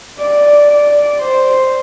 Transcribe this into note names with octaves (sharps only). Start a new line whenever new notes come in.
D5
D5
C5